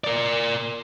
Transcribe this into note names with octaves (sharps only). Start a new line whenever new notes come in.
A#4 D5